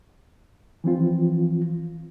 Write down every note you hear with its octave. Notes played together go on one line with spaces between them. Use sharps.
E3 F3 C4 F4